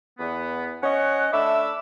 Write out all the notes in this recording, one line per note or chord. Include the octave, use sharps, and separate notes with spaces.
E2 B3
C#4 C#5 D#5 F#5
A3 D4 E5 B5 D6 E6